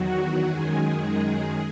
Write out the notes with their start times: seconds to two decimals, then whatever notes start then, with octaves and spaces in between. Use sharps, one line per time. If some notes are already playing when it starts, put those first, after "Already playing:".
Already playing: E2 D#3 F#3 F#4
0.45 F#2 D#3 G#3 G#4
1.00 G#4